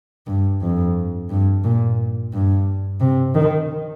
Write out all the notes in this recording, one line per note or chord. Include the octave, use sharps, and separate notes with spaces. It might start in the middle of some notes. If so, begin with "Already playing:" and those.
G2
F2
G2
A#2
G2
C3
D#3